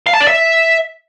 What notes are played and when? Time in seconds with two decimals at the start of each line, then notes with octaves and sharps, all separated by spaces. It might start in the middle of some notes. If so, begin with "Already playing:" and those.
0.07 F5
0.13 A5
0.20 D5
0.27 E5